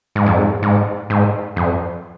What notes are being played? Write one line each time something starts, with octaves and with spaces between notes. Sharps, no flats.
G#2
F2
G#2
G#2
G#2
F2